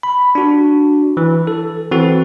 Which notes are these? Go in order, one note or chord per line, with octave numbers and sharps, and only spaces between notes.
B5
D4 F#4
E3
A4
E3 C4 F#4 A4